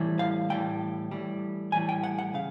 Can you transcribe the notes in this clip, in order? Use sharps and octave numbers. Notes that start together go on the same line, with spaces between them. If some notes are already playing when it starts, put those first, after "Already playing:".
Already playing: A2 E3 G3
F5
A2 E3 G3 G5
A2 E3 G3
A2 E3 G3 G#5
G5
F#5
F#5
C#3 F5